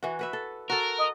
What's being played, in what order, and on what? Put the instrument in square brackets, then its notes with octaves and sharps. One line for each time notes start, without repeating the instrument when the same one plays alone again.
[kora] E3 F#4
F#4 B4 E5
A4
[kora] F#4 A4 [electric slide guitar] A#4
[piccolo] D#5